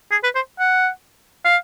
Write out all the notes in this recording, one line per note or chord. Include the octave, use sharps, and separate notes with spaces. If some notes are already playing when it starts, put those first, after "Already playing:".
G#4
B4
C5
F#5
F5